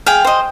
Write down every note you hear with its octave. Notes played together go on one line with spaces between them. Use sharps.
G#4 F5 G5
C5 D#5